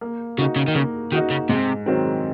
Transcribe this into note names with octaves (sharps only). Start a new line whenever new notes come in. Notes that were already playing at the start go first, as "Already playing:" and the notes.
A#3
C#3 D#4 F#4
C#3
D#3
C#3 A#3
D#3 D#4 F#4
C#3
G#2 C3
D#3 F#3 C4